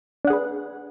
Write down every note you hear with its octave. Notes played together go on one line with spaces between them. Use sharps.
D4 G#4 B4 F#5